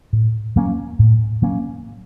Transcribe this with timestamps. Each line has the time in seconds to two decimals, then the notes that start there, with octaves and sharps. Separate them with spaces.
0.13 A2
0.56 F#3 A#3 C#4
0.99 A2
1.42 F#3 A#3 C#4